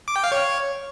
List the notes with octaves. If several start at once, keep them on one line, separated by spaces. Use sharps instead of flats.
D6
G5
F5
C#5